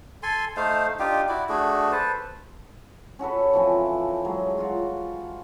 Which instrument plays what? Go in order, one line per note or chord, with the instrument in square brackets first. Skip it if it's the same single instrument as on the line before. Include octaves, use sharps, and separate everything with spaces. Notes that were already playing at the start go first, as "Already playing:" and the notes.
[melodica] A4 G#5 C6
A3 D#4 C5 F5
D4 D#4 F4 G4
E4 F#4 D5
A3 D4 F#4 G#4
A4 B4 C5
[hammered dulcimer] C#4 F#4 A4 B4
E3 F3 C4
F#3 G#3
F4 F#4